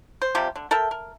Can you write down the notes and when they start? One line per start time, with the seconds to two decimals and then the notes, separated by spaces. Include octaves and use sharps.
0.22 C5
0.35 C3 F3 G3 G4
0.56 D3
0.71 A4 A#4 E5 G5
0.91 A#4